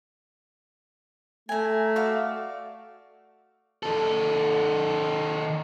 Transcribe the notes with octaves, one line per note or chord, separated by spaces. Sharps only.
A3 G#5 A#5
F#4 D5 F5
D#3 A4